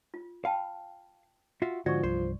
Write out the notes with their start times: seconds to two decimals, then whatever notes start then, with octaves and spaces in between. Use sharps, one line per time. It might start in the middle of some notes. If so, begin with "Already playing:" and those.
0.14 F4
0.45 F5 G5 A5 B5
1.62 F4 F#4 E5
1.86 G#2 D3 F3 F#4 D5 C#6
2.03 C2 G2 C5